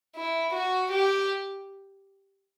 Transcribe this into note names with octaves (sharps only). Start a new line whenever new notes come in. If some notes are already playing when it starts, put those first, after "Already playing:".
E4
F#4
G4